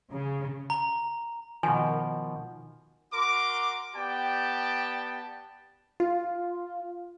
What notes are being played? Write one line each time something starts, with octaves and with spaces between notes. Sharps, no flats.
C#3
A#5
B2 D#3 F3 G#5
F#4 A#4 C6 D6
B3 G4 D5 G5 A5
F4